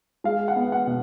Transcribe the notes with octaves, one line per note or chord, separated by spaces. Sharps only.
G#3 F5
F#5
B3
F#5
B2